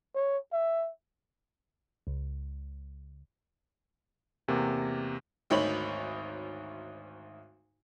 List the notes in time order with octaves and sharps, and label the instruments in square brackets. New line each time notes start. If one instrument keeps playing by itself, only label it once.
[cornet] C#5
E5
[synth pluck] C#2
[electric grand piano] E2 C3 A#3
[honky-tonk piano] G#1 D2 D#4 C#5 B5 F#7